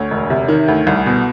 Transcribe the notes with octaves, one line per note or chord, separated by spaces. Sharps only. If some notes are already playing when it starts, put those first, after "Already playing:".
Already playing: D2 C#5
E1
C3
D#3
D2
C2
B2